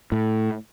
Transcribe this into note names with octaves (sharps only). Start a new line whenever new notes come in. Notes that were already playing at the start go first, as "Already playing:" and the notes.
A2